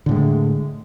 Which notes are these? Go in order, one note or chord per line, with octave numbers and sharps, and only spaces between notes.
A2 D3 G#3